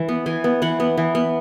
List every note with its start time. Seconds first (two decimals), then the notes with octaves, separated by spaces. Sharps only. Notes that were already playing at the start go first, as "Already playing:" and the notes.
Already playing: E3 E5
0.09 B3
0.26 E3 G#5
0.44 B3
0.62 E3 F#5
0.80 B3
0.98 E3
1.15 B3